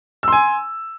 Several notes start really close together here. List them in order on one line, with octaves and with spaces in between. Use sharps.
E6 C6 G#5